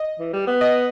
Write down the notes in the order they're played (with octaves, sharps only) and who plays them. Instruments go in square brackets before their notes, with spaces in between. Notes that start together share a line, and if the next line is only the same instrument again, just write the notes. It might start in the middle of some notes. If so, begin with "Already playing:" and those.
Already playing: [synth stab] D#5
[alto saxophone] E3
G3
B3
[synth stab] D#5